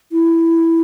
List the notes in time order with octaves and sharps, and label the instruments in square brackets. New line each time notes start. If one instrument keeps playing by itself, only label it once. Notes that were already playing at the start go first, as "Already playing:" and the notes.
[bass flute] E4